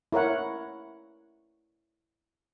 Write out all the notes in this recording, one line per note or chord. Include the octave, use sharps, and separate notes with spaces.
E4 A#4 C#5 F#5